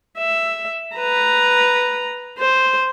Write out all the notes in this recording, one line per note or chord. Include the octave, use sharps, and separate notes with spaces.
E5
B4 A#5
C5